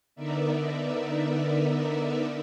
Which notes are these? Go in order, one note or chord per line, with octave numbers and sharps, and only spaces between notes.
D3 B3 D#4 A#4 D5 E5